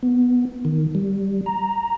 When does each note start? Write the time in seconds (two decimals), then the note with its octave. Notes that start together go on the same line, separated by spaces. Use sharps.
0.03 B3
0.65 D#3
0.95 G3
1.46 A#5